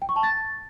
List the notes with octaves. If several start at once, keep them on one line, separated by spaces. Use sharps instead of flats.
G5
C#6
A5
A6